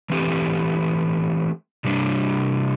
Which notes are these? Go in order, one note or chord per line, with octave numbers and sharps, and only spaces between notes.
E3 A3 C4 G4
C3 G3 D4